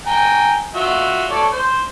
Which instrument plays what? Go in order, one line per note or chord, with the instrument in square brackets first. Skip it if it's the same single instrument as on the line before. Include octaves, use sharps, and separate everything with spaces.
[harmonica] G5 G#5 A#5
F4 F#4 E5
A4 C#5 D5
C5